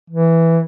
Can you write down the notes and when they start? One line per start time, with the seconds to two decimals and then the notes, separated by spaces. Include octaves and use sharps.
0.10 E3